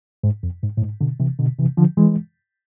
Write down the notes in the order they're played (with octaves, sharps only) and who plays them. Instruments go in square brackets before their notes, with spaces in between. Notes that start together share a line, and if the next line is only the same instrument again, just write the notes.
[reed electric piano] G#2
F2
G#2
A2
G#2
B2 D3
C3 E3
B2 D3
C3 E3
D3 F3
E3 G#3